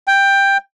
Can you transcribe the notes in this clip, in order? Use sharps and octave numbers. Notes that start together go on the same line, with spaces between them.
G5